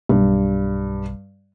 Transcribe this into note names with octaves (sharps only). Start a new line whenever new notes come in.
B1 G2